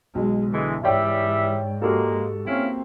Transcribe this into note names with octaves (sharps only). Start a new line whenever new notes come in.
B1 G#3
D3 E3 G#3
G#2 E3 G3 C#5 D5 E5 G5
A#2 G#3 A#3 F#4 G4 A4
A#3 C4 C#4 E4 F5